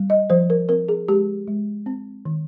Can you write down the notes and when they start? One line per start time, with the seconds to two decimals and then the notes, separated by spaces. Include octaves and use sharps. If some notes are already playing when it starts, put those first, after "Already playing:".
Already playing: G3
0.10 D#5
0.30 F3 C5
0.50 A#4
0.69 C4 A#4
0.89 G#4
1.08 G#3 G4
1.48 G#3
1.86 C4
2.25 D#3